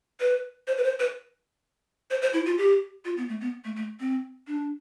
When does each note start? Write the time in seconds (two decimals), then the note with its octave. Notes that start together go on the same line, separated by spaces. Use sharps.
0.20 B4
0.67 C5
0.77 B4
0.84 C5
1.00 B4
2.11 C5
2.22 C5
2.33 E4
2.46 F4
2.58 G4
3.05 F4
3.17 B3
3.29 A3
3.41 B3
3.64 A3
3.76 A3
4.00 C4
4.47 D4